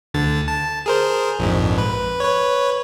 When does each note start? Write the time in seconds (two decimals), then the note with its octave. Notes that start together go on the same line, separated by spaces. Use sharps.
0.14 D2 D3 A6
0.48 A5
0.86 G#4 A#4 C5
1.39 A#1 F2 G#2
1.78 B4
2.20 B4 C#5